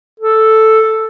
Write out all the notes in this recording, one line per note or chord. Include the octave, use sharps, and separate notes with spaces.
A4